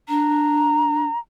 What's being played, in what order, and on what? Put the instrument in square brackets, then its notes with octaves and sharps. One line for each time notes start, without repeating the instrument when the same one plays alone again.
[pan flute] D4 [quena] A#5